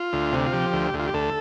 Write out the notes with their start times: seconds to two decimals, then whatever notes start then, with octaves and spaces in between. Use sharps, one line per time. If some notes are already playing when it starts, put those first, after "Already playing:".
Already playing: F4
0.13 D2
0.32 C3
0.47 F4
0.53 F3 G4
0.73 D2
0.94 D2
0.99 F4
1.07 G4
1.14 D2 A4